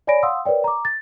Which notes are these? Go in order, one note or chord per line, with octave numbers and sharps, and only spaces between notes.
C#5 D5 G#5 B5 A#6 D7
F5 F#5 C6 D#6 E6
A#4 B4 C#5 D5 G5
A#5 D6
A6